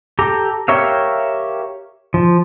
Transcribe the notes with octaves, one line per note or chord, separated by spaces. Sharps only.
G4 A4 A#5
G4 A#4 C#5 E5 F5
F3